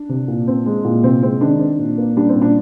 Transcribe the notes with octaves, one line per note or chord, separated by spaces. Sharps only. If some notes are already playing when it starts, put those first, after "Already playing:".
Already playing: D4
C3
A#2
C4
G#3
A#2
C3 C4
G#3 C4
D#3 D4
C4
A#2
A#3
G3 D4
C4
A#2
D4